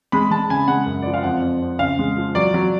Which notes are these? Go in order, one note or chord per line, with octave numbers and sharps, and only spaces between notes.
G#3 B5
G#3 A5
C#3 G#5
G#3 F#5
F#2
F3 D5
F5
F2 F#5
F2
F2
C#3 F5
G#3
F3
F#3 D5
F#3